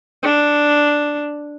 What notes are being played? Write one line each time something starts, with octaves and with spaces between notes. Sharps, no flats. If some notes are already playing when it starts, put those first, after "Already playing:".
D4